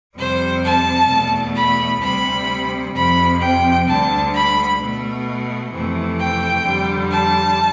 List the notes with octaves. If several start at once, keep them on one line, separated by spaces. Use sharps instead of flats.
F2 C3 G3 C5
A5
E2 B2 A3
B5
D2 C3 G3 B5
F2 C3 F3 B5
G5
D2 D3 G3 A5
B5
B2 A3
F2 C3 E3 A3
G5
F2 D3 G3
A5